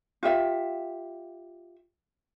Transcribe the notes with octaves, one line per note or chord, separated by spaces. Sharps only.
F4 G4 E5